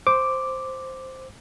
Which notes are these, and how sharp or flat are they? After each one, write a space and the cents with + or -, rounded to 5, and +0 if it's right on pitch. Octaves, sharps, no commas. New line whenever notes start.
C5 +0 D6 +0